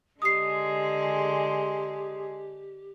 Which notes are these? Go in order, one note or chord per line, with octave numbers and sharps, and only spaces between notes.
D3 G#3 G4 G#4 D#6 C7